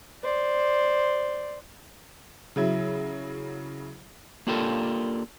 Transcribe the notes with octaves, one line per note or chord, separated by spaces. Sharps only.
C5 D5
C#3 F#3 E4
A#3 D4 F4 G4 A4 A#4